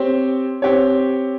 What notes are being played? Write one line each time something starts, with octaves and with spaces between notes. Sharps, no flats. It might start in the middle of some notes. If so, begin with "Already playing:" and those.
Already playing: C4 G4 C#5
C4 G4 C#5